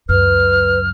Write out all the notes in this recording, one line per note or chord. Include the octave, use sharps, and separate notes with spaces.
C#2 F#2 B4 F6